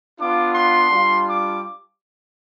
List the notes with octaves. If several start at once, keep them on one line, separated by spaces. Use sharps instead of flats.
B3 D4 F4 D6
C6
G3 D4 F4
D6